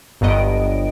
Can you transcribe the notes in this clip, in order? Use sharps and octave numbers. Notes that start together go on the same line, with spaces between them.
G1 G2 F#3 B3 D#5 D7